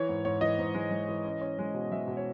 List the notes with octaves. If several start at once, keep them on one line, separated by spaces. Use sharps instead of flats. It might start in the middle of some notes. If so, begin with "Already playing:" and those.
Already playing: E3 C#5
G#2
G#2 C#5
E3 D#5
G#2
G#3
G#3
E3
C#4
C#4
G#3
B2
G#3 E5
B2
C#5